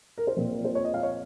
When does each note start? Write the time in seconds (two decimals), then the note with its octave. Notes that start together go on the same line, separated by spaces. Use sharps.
0.18 A#4
0.27 C5
0.37 A#2 F3 C4
0.65 C5
0.75 C#5
0.84 D#5
0.94 F5
1.03 C#5